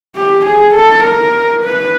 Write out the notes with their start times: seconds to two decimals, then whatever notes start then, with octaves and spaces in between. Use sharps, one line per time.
0.16 G4
0.45 G#4
0.74 A4
1.03 A#4
1.62 B4